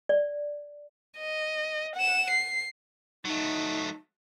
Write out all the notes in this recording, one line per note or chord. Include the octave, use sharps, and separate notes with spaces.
D5
D#5
F#5 E7
C7
F#3 A3 D#4